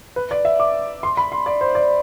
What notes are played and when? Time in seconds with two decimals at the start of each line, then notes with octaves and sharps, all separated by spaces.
0.16 B4
0.31 D5
0.45 E5
0.60 D6
1.03 C6
1.17 B5
1.32 C6
1.46 D5
1.61 C5
1.75 D5